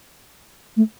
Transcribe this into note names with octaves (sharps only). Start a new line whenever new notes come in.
A3